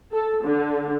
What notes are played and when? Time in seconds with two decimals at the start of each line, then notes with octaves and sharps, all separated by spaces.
0.12 A4
0.44 D3